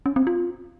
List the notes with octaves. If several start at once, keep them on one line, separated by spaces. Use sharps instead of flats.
C#4
C4
F4